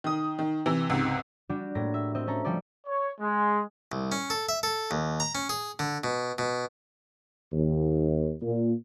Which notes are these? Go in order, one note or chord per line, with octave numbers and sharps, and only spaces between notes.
D#3 D#6
D#3
C3 E3
C#2 G#2 C3
G3 D4 F#4 G4
A2 A#3 A#6
E5
C4 D#5 E5
C#4 A4 A#5
F3 G3 A4 D5
C#5
G#3
C2
C#4
A4
E5
A4
D#2
A#5
C#4
G#4
D3
B2
B2
D#2
A#2